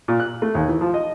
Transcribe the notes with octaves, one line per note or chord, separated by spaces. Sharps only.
A#2
F#6
A3
D#2
E3
F3
D#5